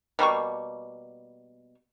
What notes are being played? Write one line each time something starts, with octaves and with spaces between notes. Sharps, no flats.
B2 G3 A#3 C#6